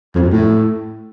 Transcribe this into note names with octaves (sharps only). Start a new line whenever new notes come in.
F2
F#2
A2